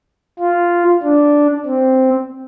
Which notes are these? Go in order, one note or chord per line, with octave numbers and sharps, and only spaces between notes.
F4
D4
C4